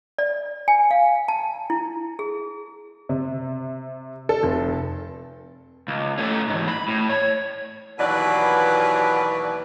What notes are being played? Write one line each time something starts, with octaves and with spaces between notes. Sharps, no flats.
D5
G#5
F5
A5
E4
G#4
C3
A4
F1
C#2
A3 C#4
G#2 E3
B5
A2
C#5
D#2 B2 E3 F#3 B4 D5